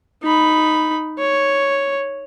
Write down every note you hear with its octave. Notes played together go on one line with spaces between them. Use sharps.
D#4 B5
C#5